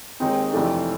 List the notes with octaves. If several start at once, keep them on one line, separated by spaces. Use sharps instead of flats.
D#2 D#3 G#3 C4 D#4
F2 C3 E3 A3 D4